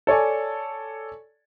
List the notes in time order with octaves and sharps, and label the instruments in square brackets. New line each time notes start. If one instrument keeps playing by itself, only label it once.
[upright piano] A4 C#5 D5 G#5